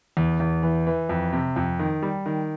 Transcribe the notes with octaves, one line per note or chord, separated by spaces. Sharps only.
E2
E2
E3
E3
F2
C3
F2
D#3
G3
D#3